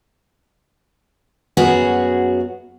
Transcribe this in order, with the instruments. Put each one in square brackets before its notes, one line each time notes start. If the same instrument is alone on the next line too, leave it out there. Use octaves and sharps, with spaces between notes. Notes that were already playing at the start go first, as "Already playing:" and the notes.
[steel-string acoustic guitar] F#2 B3 F#4 G#4 C#5